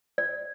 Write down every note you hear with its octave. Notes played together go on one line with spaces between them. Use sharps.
D5